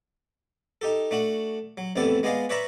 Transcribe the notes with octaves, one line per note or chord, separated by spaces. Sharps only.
D#4 G4 A4
A3 D4 F#4
F#3
A1 F2 C3 B3 A4 D5
G#3 B3 G#4 D5 D#5 F5
B4 C#5 D5 E5 A#5 B5